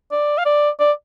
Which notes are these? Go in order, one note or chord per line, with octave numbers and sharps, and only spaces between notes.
D5
F5
D5
D5